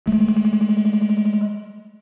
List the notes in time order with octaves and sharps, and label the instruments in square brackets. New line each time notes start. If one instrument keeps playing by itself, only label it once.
[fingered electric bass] G#3 A3